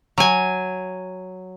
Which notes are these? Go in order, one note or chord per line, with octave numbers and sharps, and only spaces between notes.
F#3 G#5